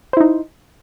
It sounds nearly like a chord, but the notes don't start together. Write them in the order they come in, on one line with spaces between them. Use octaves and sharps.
C5 E4 D#4